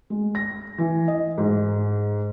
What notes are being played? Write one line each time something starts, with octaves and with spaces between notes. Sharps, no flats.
G#3
A#6
E3
D#5
G#2